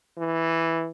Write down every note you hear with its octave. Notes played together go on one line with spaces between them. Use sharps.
E3